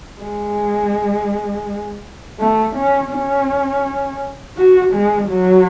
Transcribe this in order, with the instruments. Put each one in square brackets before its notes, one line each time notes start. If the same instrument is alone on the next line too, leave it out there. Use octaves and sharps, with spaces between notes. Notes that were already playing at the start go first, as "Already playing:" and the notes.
[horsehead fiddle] G#3
A3
C#4
C#4
F#4
G#3
F#3